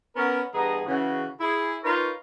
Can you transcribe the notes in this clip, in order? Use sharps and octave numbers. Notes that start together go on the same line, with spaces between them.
B3 C#4 A#4
G2 E3 B3 G#4 D#5 A#5
C#3 E3 F#4
E4 G#4
D#4 F4 A#4 B4 C#5